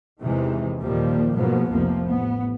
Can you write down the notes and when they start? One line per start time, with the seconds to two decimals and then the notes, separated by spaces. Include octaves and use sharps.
0.22 E2 C3 D#3 E3 G#3
0.81 D#2 A#2 D#3 F3 G3 A#3
1.35 G#2 B2 F3 F#3 A#3 B3
1.71 F1 C2 C3 F3 A#3
2.05 A1 B3